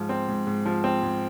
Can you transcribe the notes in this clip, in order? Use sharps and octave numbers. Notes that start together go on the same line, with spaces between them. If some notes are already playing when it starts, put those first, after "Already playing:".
Already playing: G#2 F3
C4
G#2
G#2
F3
C4
G#2